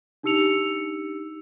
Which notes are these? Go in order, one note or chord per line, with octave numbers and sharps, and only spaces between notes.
D4 D#4 G4 E6 C#7 F7